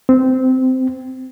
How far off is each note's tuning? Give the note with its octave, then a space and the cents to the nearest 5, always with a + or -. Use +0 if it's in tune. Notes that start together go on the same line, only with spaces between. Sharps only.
C4 -15